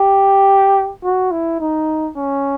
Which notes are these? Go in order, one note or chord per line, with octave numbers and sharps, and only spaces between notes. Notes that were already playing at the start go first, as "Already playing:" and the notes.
Already playing: G4
F#4
E4
D#4
C#4